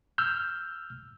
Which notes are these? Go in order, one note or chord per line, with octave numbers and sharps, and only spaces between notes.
E6 F6 G6